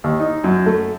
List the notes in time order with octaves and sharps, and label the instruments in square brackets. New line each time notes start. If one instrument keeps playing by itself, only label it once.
[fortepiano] D#2
D#4
F#2
A3